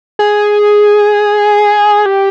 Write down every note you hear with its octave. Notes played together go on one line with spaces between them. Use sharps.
G#4
G4